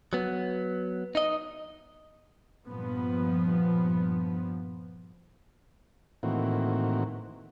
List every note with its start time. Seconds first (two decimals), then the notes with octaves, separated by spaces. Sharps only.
0.13 F#3 B3
1.15 D#4 D#5
2.66 G2 A#2 F3 B3
6.23 A2 D#3 E3 A#3 C4 F#4